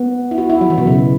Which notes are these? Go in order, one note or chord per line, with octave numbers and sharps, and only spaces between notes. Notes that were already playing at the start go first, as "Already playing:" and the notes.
Already playing: B3
E4
F#4
E4
F#3
E3
B2
C#3